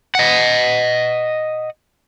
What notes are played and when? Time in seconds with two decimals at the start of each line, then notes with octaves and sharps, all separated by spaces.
0.15 D#5 F#5